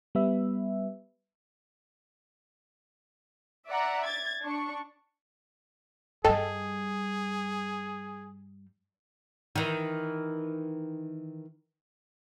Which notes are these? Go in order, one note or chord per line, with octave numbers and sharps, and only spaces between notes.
G3 B3 B4 E5
D5 E5 F#5 A#5
G#6 A6
D4 C#6
G2 G3 G#4 A4 D#5 G5 A5
D#3 E3